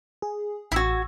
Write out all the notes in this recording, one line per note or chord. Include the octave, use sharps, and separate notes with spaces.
G#4
A1 E4 F#4 E6 G#6